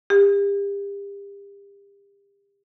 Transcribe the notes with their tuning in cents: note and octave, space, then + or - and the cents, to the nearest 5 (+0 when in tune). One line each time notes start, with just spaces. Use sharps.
G4 +35